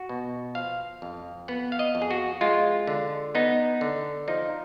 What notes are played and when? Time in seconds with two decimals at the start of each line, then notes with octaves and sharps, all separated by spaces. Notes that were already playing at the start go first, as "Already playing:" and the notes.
Already playing: F#4
0.09 B2
0.55 F3 F5
1.02 F2
1.48 B3 F#5
1.72 F5
1.79 D#5
1.95 F2
2.02 G#4
2.11 F#4
2.41 G#3 F4
2.87 D3
3.35 B3 D#4
3.81 D3
4.28 F3 D#4